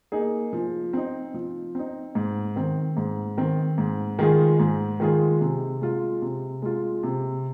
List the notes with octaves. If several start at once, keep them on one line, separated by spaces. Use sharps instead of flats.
A#3 D#4 G#4
F3
C4 D#4
F3
C4 D#4
G#2
D#3 C4
G#2
D#3 C4
G#2
D#3 G#3 F4 G#4
G#2
D#3 G#3 F4 G#4
C3
G#3 F4
C3
G#3 F4
C3